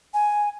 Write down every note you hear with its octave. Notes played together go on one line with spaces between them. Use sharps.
G#5